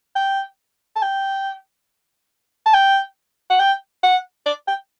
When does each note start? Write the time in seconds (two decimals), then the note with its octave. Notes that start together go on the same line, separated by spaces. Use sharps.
0.16 G5
0.96 A5
1.02 G5
2.66 A5
2.74 G5
3.50 F#5
3.60 G5
4.03 F#5
4.46 D5
4.68 G5